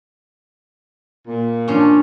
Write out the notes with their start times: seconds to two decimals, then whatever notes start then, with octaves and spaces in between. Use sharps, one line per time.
1.27 A#2
1.68 F3 C#4 D4